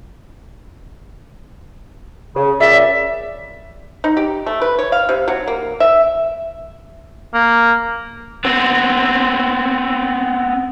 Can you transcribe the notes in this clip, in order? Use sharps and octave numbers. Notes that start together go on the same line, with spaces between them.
C#3
A#2 C#3 D5 E5
D#4
G4
A3
B4
C#5
F5
C3
F#3
A#3
E5
A#3
B3 C4